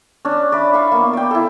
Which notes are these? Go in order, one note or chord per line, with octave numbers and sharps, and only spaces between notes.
C#4 D4
D5 E5 B5
F5 B5 C#6
A#3 B3
D5 G5
E4 A4